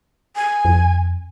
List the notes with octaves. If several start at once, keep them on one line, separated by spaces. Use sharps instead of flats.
G#5
F2